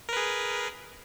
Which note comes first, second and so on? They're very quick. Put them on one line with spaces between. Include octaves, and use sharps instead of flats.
A#4 B4 G#4